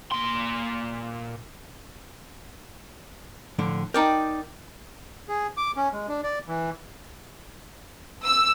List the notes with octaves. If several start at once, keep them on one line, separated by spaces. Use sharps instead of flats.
A#2 C6
A2 D3 F3
D#4 A#4 D5 G5 A5
G#4
D6
C#4
G#3
D4
D5
E3
E6